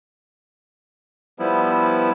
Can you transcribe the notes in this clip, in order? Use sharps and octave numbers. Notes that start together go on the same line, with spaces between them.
F3 G3 B3 E4